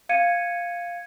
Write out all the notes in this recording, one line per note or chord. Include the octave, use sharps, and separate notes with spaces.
F5 G#6 C#7 D#7